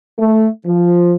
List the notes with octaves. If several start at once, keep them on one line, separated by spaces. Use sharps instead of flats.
A3
F3